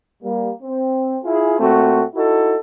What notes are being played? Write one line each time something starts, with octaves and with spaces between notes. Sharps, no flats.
G3 A#3
C4
E4 F4 G#4
A#2 A3 C4 F#4
D#4 E4 F#4 A4